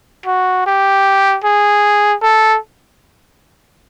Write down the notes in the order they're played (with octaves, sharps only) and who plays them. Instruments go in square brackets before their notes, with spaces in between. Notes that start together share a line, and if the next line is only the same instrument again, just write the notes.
[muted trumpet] F#4
G4
G#4
A4